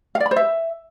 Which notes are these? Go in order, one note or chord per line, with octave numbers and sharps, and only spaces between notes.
F5
D5
B5
C5
E5